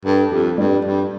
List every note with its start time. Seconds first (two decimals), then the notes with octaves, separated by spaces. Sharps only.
0.05 G2 A4
0.31 F2 G4
0.58 G2 G3
0.85 G2